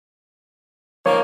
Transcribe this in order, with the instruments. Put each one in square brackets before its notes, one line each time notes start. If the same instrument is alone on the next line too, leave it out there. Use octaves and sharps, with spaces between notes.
[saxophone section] D#3 F3 A#3 [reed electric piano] C#5